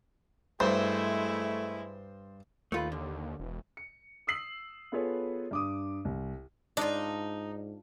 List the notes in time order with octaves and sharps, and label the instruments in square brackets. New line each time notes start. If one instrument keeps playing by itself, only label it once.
[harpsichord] G2 [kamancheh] G#3 E4 [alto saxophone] A3 [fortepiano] C5
[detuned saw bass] D#2 [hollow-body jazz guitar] A3 F4 B4
[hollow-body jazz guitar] D3
[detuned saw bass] E1
[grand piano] C#7
D#6 E6 C7 F#7
B3 F4 G#4 A4 B4 C#5
G2 D6 D#6
C2
[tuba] G#2 [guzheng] D4 F4 [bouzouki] D#4